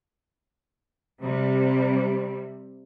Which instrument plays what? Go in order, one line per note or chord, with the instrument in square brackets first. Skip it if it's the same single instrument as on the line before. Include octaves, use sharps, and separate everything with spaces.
[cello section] C3 G3